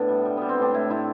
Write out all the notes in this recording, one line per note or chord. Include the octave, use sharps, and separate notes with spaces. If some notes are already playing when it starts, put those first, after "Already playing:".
Already playing: A2 B3 D4 E4
G3
G3
G3 B3
C4
A2 D4
A2 E4
A2 E4